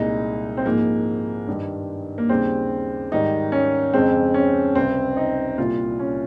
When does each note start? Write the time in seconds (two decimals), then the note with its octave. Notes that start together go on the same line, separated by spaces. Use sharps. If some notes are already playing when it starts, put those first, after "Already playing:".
Already playing: C2 A#2 G#3 D#4
0.57 C4
0.65 G#2 F3 G#3 A#3
1.47 G2 D#3 G3
2.18 A#3
2.29 D#2 C#3 G3 C4
3.12 G#2 D#3 G3 D#4
3.52 C#4
3.93 F2 C#3 G#3 C4
4.34 C#4
4.75 C#2 C3 G3 C4
5.17 D#4
5.58 C2 A#2 G3 F4
5.99 C#4